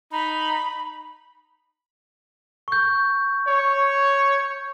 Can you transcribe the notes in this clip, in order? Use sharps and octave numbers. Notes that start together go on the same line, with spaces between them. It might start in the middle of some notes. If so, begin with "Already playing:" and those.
D#4 B5
C#6 G6
C#5